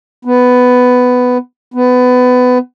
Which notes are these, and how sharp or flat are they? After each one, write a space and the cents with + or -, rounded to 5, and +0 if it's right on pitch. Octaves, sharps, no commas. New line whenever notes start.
B3 +10
B3 +20